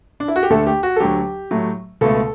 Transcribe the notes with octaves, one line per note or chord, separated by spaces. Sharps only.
D4
E4
F#4
G4
D2 D3 A3 A4
G4
F#4
A4
D2 D3 F#3 G4
A2 F#3 A3
C#2 B2 A3 A4